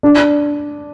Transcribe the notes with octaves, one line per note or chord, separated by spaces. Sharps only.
D4